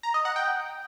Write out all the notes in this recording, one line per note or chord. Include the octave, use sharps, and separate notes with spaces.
A#5
D#5
F#5
G5